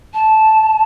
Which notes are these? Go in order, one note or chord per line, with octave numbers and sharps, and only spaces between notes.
A5